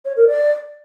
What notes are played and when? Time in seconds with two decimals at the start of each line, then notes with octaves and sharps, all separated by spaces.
0.05 C#5
0.16 A#4
0.28 D5